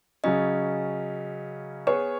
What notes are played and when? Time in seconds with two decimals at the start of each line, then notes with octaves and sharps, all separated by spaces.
0.24 C#3 F#3 C#4 D#5
1.87 B3 G#4 B4 C#5